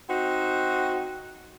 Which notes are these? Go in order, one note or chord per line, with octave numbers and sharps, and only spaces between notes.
C4 D#4 F#4